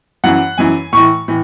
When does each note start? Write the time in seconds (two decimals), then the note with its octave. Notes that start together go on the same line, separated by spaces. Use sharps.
0.24 F#2 E3 F#5
0.58 F#2 E3 G#5
0.93 A2 E3 C#6
1.28 A2 E3